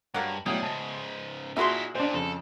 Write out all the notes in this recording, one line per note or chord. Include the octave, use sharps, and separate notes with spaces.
G2 F#3 A#3
B1 A2 G3 G#4
G#2 C#3 A5
A#2 D#4 E4 F#4 G#4 E5 B5 C6
A#2 D4 C5
F2 C#3 A4